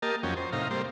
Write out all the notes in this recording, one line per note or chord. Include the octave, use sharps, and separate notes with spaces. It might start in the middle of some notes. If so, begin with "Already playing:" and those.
A#3 G4 A#4 D#5 A5
F2 F#3 C#4 G5
C5
A2 C3 D#4 F5 A#5
G3 A#3 C4 C5